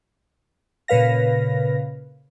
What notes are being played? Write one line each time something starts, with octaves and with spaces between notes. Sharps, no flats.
A#2 C#3 B4 F5 A#6